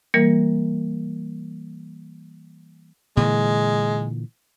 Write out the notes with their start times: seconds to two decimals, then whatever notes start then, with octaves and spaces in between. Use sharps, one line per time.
0.14 E3 G3 A#3 A#4
3.17 A#2 D3 E3 G#3